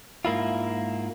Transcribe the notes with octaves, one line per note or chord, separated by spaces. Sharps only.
G#2 A#3 E4 F4